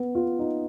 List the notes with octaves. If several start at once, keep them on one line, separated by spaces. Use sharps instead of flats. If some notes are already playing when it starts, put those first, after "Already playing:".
Already playing: B3
F4
D#4